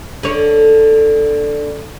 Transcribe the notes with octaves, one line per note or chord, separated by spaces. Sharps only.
D3 C#5